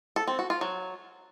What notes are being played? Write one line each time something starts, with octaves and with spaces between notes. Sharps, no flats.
A4
C4
F#4
F4
F#3